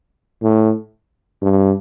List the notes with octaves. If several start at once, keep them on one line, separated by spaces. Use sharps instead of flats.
A2
G2